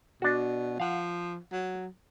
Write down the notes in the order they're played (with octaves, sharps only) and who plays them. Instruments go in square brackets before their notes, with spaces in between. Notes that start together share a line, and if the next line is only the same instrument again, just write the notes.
[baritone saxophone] B2 [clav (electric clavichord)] D4 F#4
[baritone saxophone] F3 [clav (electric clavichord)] F5 F#5
[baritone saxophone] F#3